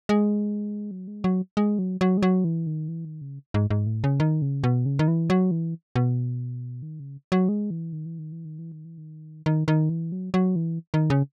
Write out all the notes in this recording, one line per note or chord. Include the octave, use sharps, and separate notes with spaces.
G#3
F#3
G#3
F#3
G#3
F#3
F#3
G#3
F#3
E3
D#3
E3
D#3
C#3
G#2
G#2
A2
C#3
D#3
C#3
B2
C#3
D#3
E3
F#3
E3
B2
D#3
C#3
F#3
G#3
E3
D#3
E3
D#3
E3
D#3
E3
D#3
E3
D#3
D#3
D#3
E3
F#3
F#3
E3
D#3
C#3